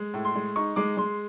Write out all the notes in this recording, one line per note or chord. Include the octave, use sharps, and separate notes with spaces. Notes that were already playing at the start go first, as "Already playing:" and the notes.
Already playing: G#3
A2
C6
G#3
D#4 C#6
G#3 D6
G#3 C6